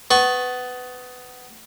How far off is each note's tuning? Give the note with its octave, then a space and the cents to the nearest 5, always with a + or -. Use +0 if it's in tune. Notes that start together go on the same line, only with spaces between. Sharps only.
B3 +20 C#6 -15